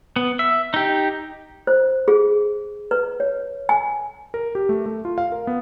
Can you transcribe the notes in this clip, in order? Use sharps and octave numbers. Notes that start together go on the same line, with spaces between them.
B3
E5
D#4 G4
C5
G#4
B4
C#5
G#5
A#4
G4
A3
A3
F4
F5
A#4
B3